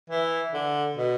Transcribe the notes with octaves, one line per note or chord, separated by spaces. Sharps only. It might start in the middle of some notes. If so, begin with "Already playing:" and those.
E3
D3
B2